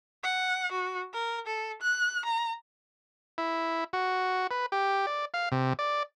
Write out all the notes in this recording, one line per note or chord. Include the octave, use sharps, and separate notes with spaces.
F#5
F#4
A#4
A4
F#6
A#5
E4
F#4
B4
G4
D5
F5
C3
D5